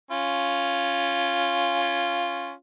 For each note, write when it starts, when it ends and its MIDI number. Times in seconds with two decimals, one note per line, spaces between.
0.11 2.52 61
0.11 2.52 65